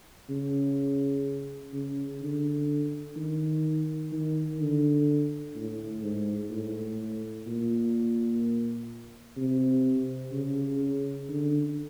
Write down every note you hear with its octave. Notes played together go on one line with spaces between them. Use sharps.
C#3
C#3
D3
D#3
D#3
D3
A2
G#2
A2
A#2
C3
C#3
D3